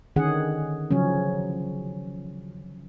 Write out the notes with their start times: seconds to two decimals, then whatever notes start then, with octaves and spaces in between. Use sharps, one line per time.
0.16 D3 D#3 C#4 G#4 F#5
0.91 C#3 F3 F#3 C#4